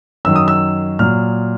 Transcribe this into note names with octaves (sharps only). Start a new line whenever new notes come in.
F#2 D#3 F#3 E6
D#6
E6
A#2 F#3 F6